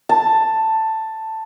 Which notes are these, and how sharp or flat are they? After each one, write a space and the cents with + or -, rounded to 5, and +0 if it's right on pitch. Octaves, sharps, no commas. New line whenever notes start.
A5 +10